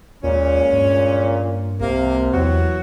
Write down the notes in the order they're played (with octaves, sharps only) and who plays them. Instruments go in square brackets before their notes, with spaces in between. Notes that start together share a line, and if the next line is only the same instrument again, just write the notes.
[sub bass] D#2 [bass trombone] A#2 [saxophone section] G#3 C#4
[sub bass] G2 [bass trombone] A#2
[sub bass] C2 [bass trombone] C3 [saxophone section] A#3
[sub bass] E2 [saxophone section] E3 F#3 F#4